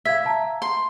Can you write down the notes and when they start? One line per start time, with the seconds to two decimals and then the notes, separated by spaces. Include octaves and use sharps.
0.05 E5 F5 G#6 B6
0.25 F5 A5 A#5
0.62 C6